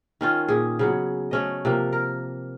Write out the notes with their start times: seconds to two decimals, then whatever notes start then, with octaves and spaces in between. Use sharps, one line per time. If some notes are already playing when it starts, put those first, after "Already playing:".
0.21 D#3 C#4 F4
0.48 A#2 G#4
0.79 C#3 F#3 B3
1.31 A3 C#4 D#5
1.65 C3 F3 A#3
1.93 A#4